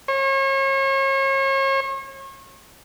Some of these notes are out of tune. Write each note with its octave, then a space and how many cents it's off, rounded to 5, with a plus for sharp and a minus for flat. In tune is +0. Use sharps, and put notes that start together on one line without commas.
C#5 -40